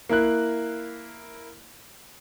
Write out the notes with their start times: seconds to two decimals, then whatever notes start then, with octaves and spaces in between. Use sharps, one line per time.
0.10 A#3 E4 F#6